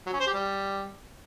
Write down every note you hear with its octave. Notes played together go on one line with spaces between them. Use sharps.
F#3
C#4
C5
G4
G3